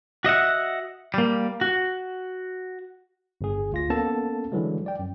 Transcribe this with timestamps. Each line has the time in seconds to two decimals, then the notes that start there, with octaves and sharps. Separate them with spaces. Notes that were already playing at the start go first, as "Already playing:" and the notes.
0.24 F#4 D#5 E5 F#5
1.14 G3 A#3
1.61 F#4
3.41 G1 G#4
3.72 D2 F4 A#6
3.90 A#3 B3 C#4 A4 A5
4.52 D3 E3 F#3 G#3
4.86 D5 G5
4.99 F#2